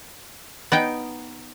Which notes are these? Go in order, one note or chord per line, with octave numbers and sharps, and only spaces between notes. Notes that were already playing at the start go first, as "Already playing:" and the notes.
B3 D#4 G5